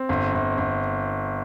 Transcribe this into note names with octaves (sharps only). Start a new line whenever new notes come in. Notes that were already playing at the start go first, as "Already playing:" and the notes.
Already playing: C4
G1
G1
G1